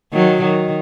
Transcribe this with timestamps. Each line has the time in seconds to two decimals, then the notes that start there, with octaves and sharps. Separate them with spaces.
0.13 D#3 F#3
0.42 D#3